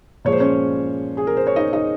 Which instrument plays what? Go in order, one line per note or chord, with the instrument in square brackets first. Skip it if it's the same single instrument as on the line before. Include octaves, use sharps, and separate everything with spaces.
[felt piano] A#2 F3 G#3 C#5
C5
C#4 C#5
G#4
A#4
C5
C#5
D#4 D#5
D#4 D#5